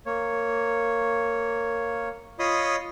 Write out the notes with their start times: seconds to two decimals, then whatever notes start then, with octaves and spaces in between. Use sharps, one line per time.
0.06 A#3 C#5
2.39 F4 C#5 D#5 B5 C6 D#6